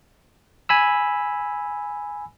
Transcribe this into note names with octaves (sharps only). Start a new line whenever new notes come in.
G#5 B5 E6